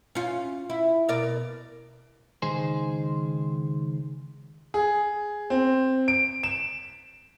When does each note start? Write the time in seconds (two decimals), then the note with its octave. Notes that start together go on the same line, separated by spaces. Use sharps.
0.15 C#4 F4
0.70 E4
1.09 B2 A#4 D5
2.42 C#2 D#3 D#4 G#4 C5
4.74 G#4
5.50 C4
6.08 D7
6.43 E7